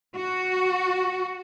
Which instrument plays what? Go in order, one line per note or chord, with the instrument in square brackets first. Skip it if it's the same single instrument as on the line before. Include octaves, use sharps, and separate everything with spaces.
[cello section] F#4